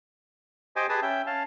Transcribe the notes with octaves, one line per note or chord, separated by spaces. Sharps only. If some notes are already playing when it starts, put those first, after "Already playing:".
G4 C5 D#5 G#5 D6
G4 G#4 B4 G#5 A5 D#6
C#4 E5 G5
C#4 F5 A5